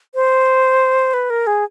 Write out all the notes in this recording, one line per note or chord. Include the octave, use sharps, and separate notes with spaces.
C5
B4
A#4
G#4